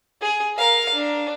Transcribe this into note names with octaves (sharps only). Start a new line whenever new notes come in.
G#4
A#4 F5
D4